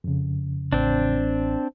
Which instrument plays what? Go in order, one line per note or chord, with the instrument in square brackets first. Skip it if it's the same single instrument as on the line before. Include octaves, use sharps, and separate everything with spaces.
[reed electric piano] F2 C#3
[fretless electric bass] A1 [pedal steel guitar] C4 D4